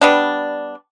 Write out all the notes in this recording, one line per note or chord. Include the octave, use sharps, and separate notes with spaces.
G3 B3 D4